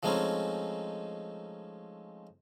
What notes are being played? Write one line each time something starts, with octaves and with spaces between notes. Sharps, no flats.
F3 G#3 A3 C4 C#4 D#4